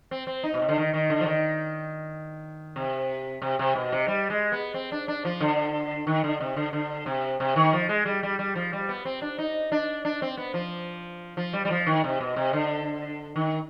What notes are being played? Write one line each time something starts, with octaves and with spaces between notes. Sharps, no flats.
C4
C4
D#4
B2
C3
D3
D#3
D#3
D3
F3
D#3
C3
C3
C3
B2
C3
G3
G#3
B3
C4
D4
D4
F3
D3
D#3
D3
C3
D3
D3
C3
C3
D#3
F3
G#3
G3
G3
G3
F3
G3
B3
C4
D4
D#4
D4
D4
C4
B3
F3
F3
G3
G3
F3
D#3
C3
B2
C3
D3
D#3